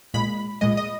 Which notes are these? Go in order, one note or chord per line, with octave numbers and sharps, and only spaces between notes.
A#2 G#3 B5
A#2 G#3 D#5
D#5